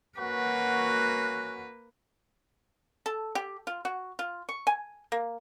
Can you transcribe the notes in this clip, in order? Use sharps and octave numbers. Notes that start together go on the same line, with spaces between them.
A#3 C#4 F#4 B4
A4
G4
F4
F#4
F4
C#6
G#5
A#3